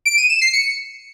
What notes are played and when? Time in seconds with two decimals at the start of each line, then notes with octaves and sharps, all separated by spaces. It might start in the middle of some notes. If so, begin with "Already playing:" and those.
0.05 D7
0.17 D#7
0.29 E7
0.41 C7
0.53 C#7